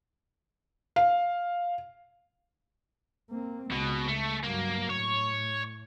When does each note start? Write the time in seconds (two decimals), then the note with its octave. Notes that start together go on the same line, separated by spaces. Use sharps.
0.96 F5
3.31 A#3 C4
3.72 C#2 B2
4.08 A3
4.44 G2 F#3 A#3
4.90 A2 C#5